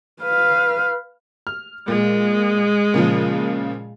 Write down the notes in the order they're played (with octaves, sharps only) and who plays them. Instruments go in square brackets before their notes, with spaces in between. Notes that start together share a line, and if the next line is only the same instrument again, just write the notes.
[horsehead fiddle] B4 F5
[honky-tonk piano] F6
[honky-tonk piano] A#2 [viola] G#3
[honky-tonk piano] A#2 C#3 F3